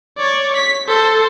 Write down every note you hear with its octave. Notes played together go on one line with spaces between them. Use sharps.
C#5 D5
B6
A4 C5